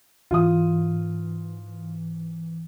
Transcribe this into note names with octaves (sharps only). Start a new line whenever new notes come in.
G#2 E3 F4 D#6